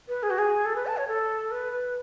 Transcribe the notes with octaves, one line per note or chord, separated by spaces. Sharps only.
B4
G#4
F#4
G#4
A4
B4
A5
C#5
A4
B4